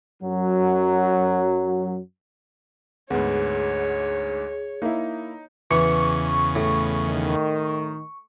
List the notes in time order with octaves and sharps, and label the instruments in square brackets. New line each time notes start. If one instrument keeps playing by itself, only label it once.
[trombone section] F#2 F#3
[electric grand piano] D2 G#2 [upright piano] B3 [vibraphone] G#4 [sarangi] C#5
[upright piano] A#3 E4 [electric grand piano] D#4
[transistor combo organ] E2 C#3 [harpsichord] E3 [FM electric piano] C#6
[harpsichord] A2
[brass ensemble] D#3